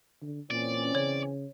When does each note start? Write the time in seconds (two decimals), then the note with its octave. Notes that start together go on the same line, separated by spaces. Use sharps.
0.22 D3
0.51 A#2 E3 C4 C#4 D5
0.95 C#3 C#5